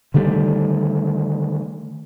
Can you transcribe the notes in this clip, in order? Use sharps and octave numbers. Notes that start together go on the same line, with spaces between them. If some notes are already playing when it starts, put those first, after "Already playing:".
D3 D#3 G3 A3